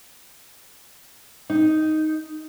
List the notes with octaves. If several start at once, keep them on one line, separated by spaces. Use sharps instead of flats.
D#4